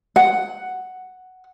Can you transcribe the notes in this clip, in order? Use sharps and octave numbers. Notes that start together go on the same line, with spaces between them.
F#5